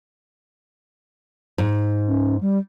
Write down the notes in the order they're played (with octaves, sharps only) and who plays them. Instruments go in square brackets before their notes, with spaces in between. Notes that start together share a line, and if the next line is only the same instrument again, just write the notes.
[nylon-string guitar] G#2
[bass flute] C#4
G3